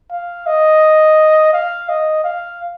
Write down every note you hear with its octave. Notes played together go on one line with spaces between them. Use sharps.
F5
D#5
F5
D#5
F5